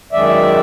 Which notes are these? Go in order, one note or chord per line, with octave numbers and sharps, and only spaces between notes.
F#2 D#3 G#3 D5 E5